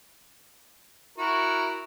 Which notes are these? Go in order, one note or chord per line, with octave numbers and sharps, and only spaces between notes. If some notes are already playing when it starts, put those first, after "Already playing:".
E4 F#4 A#4